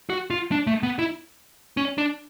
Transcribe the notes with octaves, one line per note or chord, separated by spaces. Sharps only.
F#4
F4
D4
A3
B3
E4
C#4
D4